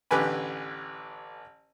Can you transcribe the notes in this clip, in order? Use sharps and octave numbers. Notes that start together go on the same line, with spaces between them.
A1 D3 G4 B4 G#5 B5